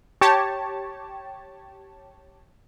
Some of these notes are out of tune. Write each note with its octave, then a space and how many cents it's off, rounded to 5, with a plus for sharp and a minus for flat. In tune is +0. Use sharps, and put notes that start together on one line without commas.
G4 -15 C#5 -10 A5 +0